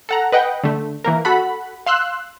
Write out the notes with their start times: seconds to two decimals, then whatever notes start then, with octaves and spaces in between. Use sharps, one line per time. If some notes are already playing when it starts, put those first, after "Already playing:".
0.09 A4 F#5 A#5
0.32 B4 D#5 F#5 G5
0.64 D3 A3
1.04 E3 A#3 A#4
1.25 F#4 A4 F#5 B5
1.86 F5 C6 E6 F#6